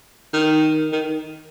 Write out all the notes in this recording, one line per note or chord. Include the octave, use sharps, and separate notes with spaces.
D#3
D#3